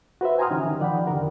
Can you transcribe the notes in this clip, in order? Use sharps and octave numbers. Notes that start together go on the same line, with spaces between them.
F#4 B4 C5 E5
G5 G#5 A#5 C6 D#6 F6
D3 E3 C#4 D#4 G4
D#3
F3 D5 F#5 G5 B5
E2 D3 D#3 G4 A#4